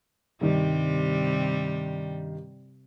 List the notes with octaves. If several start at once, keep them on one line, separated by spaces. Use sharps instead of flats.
G2 C3 D#3 G3